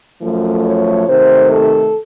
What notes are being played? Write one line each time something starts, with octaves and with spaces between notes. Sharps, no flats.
F#2 F3 A3
C#5
C3 D#3 A3 C5
A4